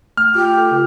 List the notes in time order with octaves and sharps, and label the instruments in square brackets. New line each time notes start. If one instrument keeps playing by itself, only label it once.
[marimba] A3 [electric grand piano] F6
[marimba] F4 [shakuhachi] G4
[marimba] A4
C#3 F4